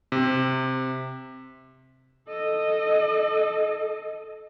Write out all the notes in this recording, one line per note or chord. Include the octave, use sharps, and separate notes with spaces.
C3
A4 D#5